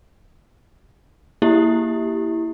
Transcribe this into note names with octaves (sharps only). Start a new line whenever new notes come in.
A#3 E4 G4